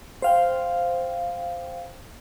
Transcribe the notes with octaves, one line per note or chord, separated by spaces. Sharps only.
C5 F5 G5